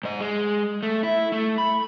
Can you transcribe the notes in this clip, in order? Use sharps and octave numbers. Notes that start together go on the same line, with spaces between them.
G#2 D#5
G#3
A3
E4
A3
B5